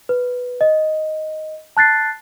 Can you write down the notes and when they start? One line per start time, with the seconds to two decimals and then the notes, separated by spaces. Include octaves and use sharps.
0.09 B4
0.61 D#5
1.77 A5 F#6 A6 C7